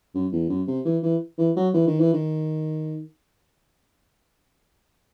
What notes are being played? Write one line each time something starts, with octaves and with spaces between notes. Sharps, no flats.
F#2
E2
F#2
C3
E3
E3
E3
F#3
E3
D#3
E3
D#3